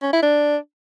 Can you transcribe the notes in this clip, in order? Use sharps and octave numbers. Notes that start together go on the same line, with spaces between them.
C#4
E4
D4